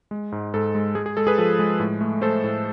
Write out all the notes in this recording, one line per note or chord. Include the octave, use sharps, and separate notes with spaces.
G#3
G#2
G#2 A4
G#3
G#3 G#4
G#4
G#3 A4
G#4 B4
F3 A4
G#3
A2
A3
A3 A4 C5
A2